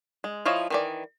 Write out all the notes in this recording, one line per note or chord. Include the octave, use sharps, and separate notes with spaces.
G#3
F3 E4 F4 C#5 D#5
D#3 E3 D5